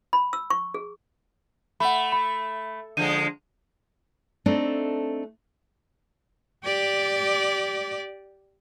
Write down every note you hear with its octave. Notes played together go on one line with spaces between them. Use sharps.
B5
E6
C#6
G#4
A3 F#5 B5
B5
D3 F3 G#3 D#7
A3 C4 D4 D#4 A4
G4 D5